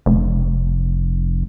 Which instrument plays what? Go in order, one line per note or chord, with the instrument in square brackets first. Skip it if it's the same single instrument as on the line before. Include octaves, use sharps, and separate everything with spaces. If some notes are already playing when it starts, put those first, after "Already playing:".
[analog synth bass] F1